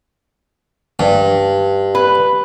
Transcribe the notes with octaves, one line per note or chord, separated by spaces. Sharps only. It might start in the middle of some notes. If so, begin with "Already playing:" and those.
G2
B4